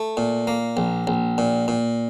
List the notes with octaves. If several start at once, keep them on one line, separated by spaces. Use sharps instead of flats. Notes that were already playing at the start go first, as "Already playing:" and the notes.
Already playing: A3
A#2
A#3
A#1
A#1
A#2
A#2